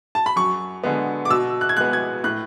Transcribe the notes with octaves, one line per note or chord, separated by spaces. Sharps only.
A5
B5
F#2 C#6
D3 G#3 B3
D6
B2 E6
F#6
G#6
G#3 B3 F#6
G#6
A2 F#6